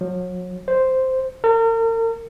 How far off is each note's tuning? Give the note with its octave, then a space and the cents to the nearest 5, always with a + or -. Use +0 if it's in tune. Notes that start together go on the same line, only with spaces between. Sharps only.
F#3 -35
C5 -5
A#4 -40